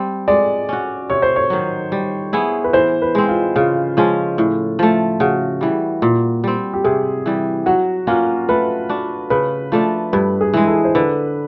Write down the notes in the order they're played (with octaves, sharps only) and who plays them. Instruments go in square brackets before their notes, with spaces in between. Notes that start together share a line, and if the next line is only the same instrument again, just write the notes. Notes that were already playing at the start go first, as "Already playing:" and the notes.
Already playing: [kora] G3 C4
[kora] G#3 [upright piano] D5
[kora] C#4 F#4
[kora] C3 [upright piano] C#5
[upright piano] C5
C#5
[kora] D#3 F#3
G3
B3 E4 G#4
[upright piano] B4
[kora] E3 [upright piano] C5
[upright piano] B4
[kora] G#3 C4
[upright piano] F4
[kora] C#3 [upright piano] F4
[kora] F3 G#3 C#4
A2
F3 A3
[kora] C#3 [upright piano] F#4
[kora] E3 G3
A#2
G3 C4
[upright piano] G4
[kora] C3 [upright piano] G#4
[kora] E3 G3
[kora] F#3 [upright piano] F#4
[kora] A#3 C#4 F#4 [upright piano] F4
[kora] A3 [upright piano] B4
[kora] D4 F#4
[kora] C#3 [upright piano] B4
[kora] F3 A3 D4
[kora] G2 [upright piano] B4
[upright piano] G#4
[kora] E3 G#3
[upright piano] A4
C5
[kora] D3 [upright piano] B4